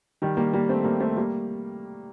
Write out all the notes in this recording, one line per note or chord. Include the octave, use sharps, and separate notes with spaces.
D#3 G3
G3 A#3
G3 A#3
A3 C4
G3 A#3
A3 C4
G3 A#3